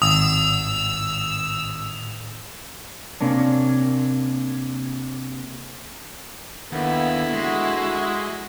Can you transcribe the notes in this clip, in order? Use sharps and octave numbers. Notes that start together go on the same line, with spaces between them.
G#1 A2 D#6 E6
C3 A#3 C#4 D4
D#2 D3 B3 E4
G#3 F#4